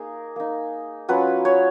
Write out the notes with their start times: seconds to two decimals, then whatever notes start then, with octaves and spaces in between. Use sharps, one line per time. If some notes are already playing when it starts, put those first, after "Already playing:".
Already playing: A#3 D#4 G#4 A#4
0.36 A#3 D#4
1.09 F#3 C#4 F4 B4
1.45 C#5